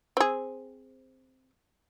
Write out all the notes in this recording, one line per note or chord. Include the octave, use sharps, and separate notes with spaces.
C4 G#4